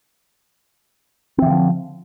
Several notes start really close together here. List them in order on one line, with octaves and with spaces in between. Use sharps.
C4 E3 D3 F3